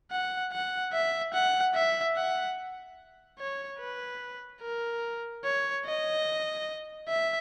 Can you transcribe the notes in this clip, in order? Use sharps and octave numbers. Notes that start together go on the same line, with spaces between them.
F#5
F#5
E5
F#5
E5
F#5
C#5
B4
A#4
C#5
D#5
E5